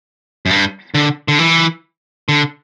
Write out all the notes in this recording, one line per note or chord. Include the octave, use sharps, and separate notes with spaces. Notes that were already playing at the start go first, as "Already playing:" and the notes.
F#2
G2
D3
D3
E3
D3